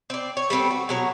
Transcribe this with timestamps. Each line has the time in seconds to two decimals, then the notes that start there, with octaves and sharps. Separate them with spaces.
0.10 C4 D5
0.37 C#5
0.50 G3 B3 C4 A4
0.70 F#4
0.89 B2 F#3 C#5